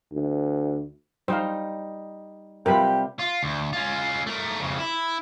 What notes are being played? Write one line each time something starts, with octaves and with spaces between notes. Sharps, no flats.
D2
G3 D#4 C5 F5
C3 G3 F4 G4 A#4 B4 B5
F4
D2
C#4 F4
A3 A#4
F2 C#3
E4